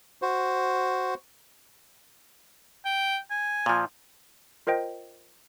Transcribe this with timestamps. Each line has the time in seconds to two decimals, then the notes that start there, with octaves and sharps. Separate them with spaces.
0.22 F#4 C5
2.85 G5
3.31 G#5
3.66 A#2 F3
4.67 F4 A#4 C5 D#5 G5